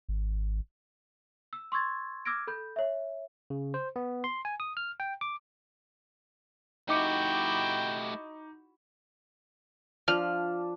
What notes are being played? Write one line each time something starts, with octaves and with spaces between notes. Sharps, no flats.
G#1
E6
C6 C#6 E6 G#6 A6
D6 E6 F6 G#6 A#6 D7
A4 B5 G6
C#5 E5
C#3
C5
B3
C6
G#5
D#6
F6
G5
D6
A3 D#4 E4 F#4 G4 G5 D6 C#7
F3 D4 F6